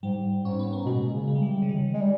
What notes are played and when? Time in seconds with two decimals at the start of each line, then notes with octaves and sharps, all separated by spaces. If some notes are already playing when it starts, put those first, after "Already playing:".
0.03 G#2 G3
0.44 G#2 C#4
0.59 B3
0.73 A#3
0.86 B2 G#3
1.07 C#3
1.28 G#3
1.35 G3
1.43 E3
1.51 G3
1.62 C#3
1.69 D#3
1.94 G#3
2.02 G3